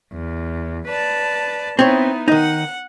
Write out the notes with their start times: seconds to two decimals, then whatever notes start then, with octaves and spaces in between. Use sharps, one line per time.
0.13 E2
0.88 B4 D5 A5
1.79 B3 C4 D#4 E4 C#5
2.28 D#3 D#4 F#5